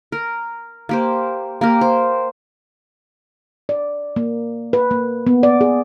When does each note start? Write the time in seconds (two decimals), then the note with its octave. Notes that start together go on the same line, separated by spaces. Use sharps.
0.12 A#4
0.89 A#3 G4 C5
1.61 A#3 G4 A#4
1.81 C5
3.69 D5
4.16 A#3
4.73 B4
4.91 A#3
5.27 B3
5.43 D5
5.61 G#4